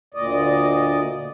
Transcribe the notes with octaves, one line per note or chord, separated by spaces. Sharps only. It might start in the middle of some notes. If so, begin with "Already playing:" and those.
D2 A#2 D5 D#5